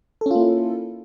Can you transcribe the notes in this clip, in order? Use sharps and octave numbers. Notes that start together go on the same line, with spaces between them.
A#3 C#4 E4 F4 A4